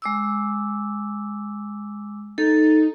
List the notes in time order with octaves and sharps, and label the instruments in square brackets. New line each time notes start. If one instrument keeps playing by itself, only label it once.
[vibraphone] G#3 D6 E6
[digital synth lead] D#4 [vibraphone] A4